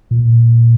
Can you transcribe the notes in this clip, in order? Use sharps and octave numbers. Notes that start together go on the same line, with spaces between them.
A#2